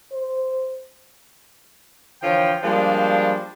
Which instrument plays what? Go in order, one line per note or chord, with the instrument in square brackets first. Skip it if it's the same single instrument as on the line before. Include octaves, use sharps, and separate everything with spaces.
[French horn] C5
[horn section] D3 E3 F3 C#5 G5
F3 G3 G#3 A#3 D4 C5